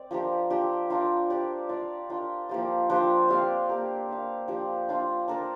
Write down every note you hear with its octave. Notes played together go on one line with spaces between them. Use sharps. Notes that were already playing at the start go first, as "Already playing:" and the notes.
Already playing: C4 D5
F3 D4 G4 A#4
F3 D4 G4
D4 F4 A#4 D5
G3 D4 G4 D5
D4 F4 D5 F5
D4 F4 A#4 D5
F3 A#3 G4 D5
F3 D4 G4 C5
C4 G4 D5 F5
A#3 G4 A#4
D4 A#4 F5
F3 D4 G4 D5
D4 F4 D5
D4 A#4 D5